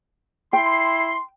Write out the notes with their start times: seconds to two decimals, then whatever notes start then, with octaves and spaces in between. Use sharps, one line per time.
0.53 E4 G5 C6 C7